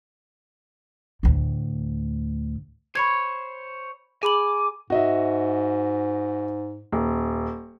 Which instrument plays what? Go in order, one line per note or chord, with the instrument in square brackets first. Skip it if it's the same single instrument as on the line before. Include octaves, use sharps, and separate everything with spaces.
[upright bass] D2 A2
[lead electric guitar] C5 C#5 [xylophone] B5 C#6 G#6
[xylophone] G#4 B5 F#7 [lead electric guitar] G#5 [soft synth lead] D6
[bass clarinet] G#2 [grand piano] F#4 D#5 E5
[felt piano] D#1